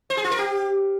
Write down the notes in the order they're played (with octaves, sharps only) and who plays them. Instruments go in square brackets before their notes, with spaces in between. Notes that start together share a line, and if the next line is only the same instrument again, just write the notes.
[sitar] C5
G#4
F4
A#4
G4